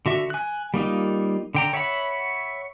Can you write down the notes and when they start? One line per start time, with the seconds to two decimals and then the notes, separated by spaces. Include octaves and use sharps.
0.06 D3 F#4 E5
0.30 G#5 F#6
0.74 G3 A#3 D#4 F4
1.55 D3 G5 A#5
1.73 C#5 E5 F#5 B5